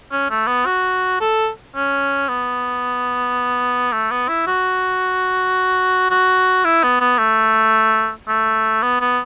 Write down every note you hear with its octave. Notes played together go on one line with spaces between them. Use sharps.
C#4
A3
B3
F#4
A4
C#4
B3
A3
B3
E4
F#4
F#4
E4
B3
B3
A3
A3
B3
B3